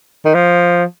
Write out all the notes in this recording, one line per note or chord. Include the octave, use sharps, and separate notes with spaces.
D#3
F3